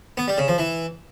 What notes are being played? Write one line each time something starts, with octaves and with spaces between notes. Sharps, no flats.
B3
G3
C#3
F3
E3